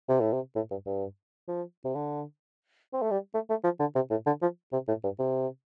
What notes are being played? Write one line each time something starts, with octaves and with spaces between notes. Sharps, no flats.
C3
A2
C3
A2
G2
G2
F3
C3
D3
C4
A3
G3
A3
A3
F3
D3
C3
A2
D3
F3
C3
A2
G2
C3